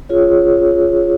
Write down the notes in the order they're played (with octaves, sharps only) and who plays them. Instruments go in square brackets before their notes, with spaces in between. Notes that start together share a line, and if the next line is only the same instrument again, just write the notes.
[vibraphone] C#4 F4 G#4 C#5